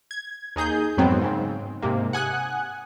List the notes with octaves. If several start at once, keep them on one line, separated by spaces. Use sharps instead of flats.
G#6
D#2 D#4 G#4 G6
F2 G#2 D#3 F#3 B3 C4
G#2 C#3 C4
G#2 C3 A#3
F#5 G#5 D#6 F#6